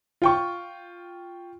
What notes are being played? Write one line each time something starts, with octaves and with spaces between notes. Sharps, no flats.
F4 G5 C#6